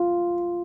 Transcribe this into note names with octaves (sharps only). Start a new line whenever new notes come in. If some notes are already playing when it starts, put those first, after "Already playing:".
Already playing: F4